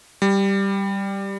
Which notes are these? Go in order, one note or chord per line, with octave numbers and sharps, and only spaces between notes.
G3